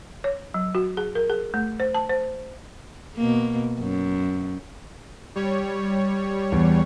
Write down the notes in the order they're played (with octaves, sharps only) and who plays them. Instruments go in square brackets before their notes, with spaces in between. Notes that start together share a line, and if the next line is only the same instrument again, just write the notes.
[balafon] C#5
F#3
F#4
G#4
A#4
G#4
A3
C5
A5
C5
[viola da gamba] B2 A#3
F#2
[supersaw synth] G3 C#5
[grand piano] E2